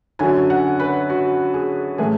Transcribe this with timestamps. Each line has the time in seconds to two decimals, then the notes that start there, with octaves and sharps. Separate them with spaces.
0.19 F#2 D3 F#3 G#5
0.50 F#5
0.80 B4
1.10 F#4
1.54 G#4
1.98 A2 E3 A3 G#4